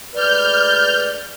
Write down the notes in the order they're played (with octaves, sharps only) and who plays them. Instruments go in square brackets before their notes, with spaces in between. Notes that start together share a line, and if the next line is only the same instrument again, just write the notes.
[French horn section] D2 G#3 B4 [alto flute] D5 [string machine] F6 G6